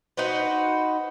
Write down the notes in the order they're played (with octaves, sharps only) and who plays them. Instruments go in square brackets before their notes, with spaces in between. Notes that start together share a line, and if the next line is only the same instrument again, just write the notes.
[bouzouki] D#4 F#4 B4 C5